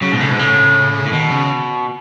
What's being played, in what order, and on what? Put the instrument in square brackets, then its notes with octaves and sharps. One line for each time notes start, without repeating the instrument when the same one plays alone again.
[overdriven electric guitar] C#3 [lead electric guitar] F#3
[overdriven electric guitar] G#2 [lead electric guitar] B2
[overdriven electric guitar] A2 [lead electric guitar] C#3
[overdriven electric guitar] G#2 [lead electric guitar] B2
[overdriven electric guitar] A2 [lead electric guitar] C#3
[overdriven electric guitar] A2
[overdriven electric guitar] B2 [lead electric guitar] D#3
[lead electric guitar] C#3